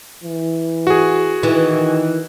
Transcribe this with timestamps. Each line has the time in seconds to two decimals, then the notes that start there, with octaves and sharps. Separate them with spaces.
0.24 E3
0.87 F#4 G#4
1.43 D#3 E3